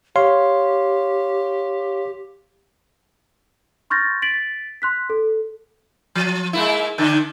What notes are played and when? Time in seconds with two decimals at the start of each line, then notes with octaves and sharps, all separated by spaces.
0.16 G4 C#5 F5 C6
3.90 C6 C#6 F6 G6 A6 A#6
4.22 A6 B6 D7 F#7
4.82 C6 F#6 B6
5.10 A4
6.15 F3
6.53 G#3 A#3 E4
6.98 D3 D#3 D4